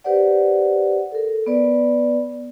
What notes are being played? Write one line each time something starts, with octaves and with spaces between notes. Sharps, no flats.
G4 B4 C5 D5 F#5
A4 A#4
B3 B4 D5